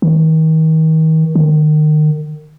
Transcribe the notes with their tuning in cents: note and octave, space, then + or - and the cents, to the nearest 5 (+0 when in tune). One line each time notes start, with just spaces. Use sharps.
D#3 +35
D#3 -30